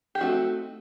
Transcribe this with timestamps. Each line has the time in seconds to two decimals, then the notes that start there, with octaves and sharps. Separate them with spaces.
0.15 G4
0.21 A3 C4 D#4 F#4